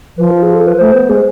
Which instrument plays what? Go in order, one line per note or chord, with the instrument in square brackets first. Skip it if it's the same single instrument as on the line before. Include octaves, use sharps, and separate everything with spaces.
[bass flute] F3 [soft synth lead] B4
[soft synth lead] F4
G#4
A4
B4
[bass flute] A3 [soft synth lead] C5
[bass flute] B3
[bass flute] G#3 [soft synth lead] G#4